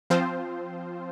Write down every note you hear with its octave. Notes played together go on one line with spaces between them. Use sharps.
F3 C4 F4 C5